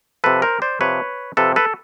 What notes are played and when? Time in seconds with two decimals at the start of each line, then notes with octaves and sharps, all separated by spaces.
0.24 C3 F3 A4 B4
0.42 A#4 C5
0.62 C5 D5
0.81 C3 F3 B4 C#5
1.37 C3 F3 A4 B4
1.56 A4 B4